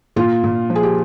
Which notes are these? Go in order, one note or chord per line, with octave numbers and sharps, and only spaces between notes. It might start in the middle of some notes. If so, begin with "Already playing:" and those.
A#2 F4
A#2
F3
G#4
G4